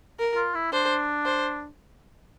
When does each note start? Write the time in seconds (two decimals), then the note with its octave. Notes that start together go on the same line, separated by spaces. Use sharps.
0.19 A#4
0.36 F4
0.55 E4
0.72 D4 C5
1.25 C5